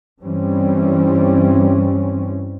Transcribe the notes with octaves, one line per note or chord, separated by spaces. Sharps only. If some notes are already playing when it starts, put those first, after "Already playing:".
G2 E3 G3 C4 C#4